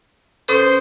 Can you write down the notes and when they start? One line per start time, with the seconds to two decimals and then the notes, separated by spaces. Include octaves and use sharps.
0.48 B2 C#4 A4 C5